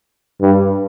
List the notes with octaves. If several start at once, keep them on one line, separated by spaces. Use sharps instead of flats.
G2